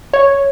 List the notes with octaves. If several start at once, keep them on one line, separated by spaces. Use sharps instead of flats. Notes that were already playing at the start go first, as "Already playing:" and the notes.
C#5